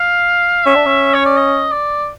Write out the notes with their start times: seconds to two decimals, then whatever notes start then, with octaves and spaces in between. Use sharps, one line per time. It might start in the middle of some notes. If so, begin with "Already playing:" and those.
Already playing: F5
0.66 C#4 E5
0.76 D4
0.86 C#4
1.14 C#5
1.25 D5
1.37 D#5
1.72 D5